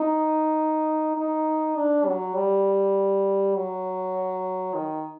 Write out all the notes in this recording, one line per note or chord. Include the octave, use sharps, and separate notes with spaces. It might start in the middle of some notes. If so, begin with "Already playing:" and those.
Already playing: D#4
D#4
D4
F#3
G3
F#3
D#3